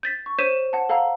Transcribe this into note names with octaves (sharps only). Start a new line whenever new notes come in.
G6 A6 B6
C#6
C5 C#5 G6 B6 D#7 E7
F#5 A5
A4 F5 F#5 A#5